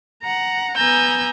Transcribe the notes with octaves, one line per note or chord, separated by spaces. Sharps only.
F#5 A#5
B3 G#5 A#5 E6 G6